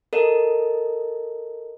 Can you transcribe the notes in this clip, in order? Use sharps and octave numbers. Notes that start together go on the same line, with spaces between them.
A4 A#4 D#5